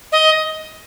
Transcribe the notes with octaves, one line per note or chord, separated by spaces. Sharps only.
D#5